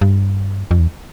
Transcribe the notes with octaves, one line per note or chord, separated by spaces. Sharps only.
G2
F2
E2